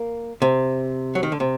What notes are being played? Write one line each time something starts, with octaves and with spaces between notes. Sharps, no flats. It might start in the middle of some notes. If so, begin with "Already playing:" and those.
Already playing: A#3
C3
F#3
D#3
D3
C3